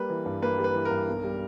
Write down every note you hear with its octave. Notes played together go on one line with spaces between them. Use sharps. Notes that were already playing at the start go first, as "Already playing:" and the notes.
Already playing: G3 A#3 B4
E3
G2
A#3 B4
G3
B4
E3
A#4
G2
B1
G3